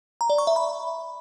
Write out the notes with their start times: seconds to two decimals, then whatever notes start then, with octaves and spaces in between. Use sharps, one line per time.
0.21 A#5
0.30 D5
0.38 C#6
0.47 E5
0.56 B5